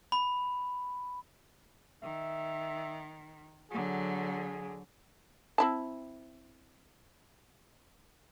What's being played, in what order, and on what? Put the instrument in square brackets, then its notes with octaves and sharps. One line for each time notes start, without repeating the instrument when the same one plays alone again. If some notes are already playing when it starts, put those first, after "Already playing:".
[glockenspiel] B5
[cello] D#3 [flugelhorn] E5
[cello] D3 F#3 [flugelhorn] G#4
[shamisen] C4 E4 A5